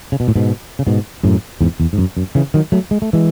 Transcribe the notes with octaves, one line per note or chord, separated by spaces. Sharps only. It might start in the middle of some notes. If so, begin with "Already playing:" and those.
C#3
B2
A2
G#2 B2
C#3
G#2 B2
F#2 A2
E2 G#2
E2
G#2
F#2
F#2
C#3 E3
D#3 F#3
F#3 A3
G#3
A3
E3 G#3